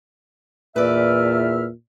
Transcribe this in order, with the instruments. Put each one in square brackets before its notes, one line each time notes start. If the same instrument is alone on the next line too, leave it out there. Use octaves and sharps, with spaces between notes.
[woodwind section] E2 E5 F6 [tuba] A#2 [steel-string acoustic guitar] B4 D5